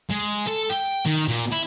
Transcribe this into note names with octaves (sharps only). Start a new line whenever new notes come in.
G#3
A4
G5
D#3
A#2
E4